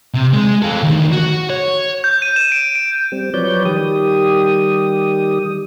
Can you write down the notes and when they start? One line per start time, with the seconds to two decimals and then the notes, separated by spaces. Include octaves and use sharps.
0.14 C3
0.33 G#3
0.62 F4 A4
0.83 D2 D#3
1.12 F#4
1.50 C#5
2.04 G6
2.22 D#7
2.36 E7
2.52 D7
2.75 D7
3.12 G3 C4
3.34 F3 F#3 B4 C#5 D5 G6
3.65 D#3 G3 G4 D#6